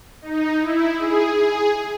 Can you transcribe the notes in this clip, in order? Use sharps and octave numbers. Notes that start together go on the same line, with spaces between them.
D#4
E4
G#4
G#4